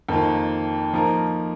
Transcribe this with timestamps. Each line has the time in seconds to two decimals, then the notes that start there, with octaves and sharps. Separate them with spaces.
0.09 F2 D#3 A#3 F4
0.94 F3 A#3 D#4 A#4